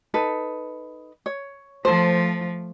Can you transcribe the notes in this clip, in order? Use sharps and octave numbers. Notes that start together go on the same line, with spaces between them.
D#4 A4 B4
C#5
F3 A3 A4 C5